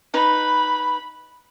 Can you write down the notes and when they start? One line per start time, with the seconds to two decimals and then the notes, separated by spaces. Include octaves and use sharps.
0.14 D#4 B4 B5